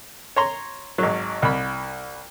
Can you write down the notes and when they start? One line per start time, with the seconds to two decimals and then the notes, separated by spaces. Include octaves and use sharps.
0.36 C#5 A#5 C6
0.98 G#1 F#3
1.42 C2 B5